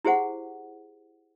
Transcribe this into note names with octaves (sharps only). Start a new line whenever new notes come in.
E4 G4 G#4 C5 F#5